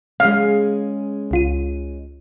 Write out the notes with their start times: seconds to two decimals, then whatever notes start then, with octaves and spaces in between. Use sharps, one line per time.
0.20 C#3 G#3 C#4 G#4 F5
1.31 C#2 F4 D#7